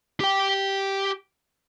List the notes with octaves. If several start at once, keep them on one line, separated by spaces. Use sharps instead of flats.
G4 G5